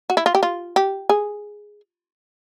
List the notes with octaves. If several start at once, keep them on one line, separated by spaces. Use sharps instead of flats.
F#4
E4
F4
G4
F4
G4
G#4